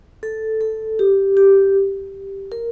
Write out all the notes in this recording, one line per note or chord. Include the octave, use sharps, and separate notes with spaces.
A4
A4
G4
G4
A#4